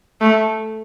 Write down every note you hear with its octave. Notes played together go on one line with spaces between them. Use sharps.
A3